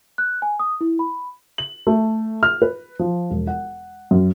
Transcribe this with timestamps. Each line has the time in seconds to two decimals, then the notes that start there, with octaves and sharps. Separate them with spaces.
0.18 F#6
0.42 G#5
0.60 D#6
0.81 E4
0.99 B5
1.58 F#7
1.87 A3
2.43 F6
2.62 B4
2.99 F3
3.30 E1
3.47 F#5
4.11 F#2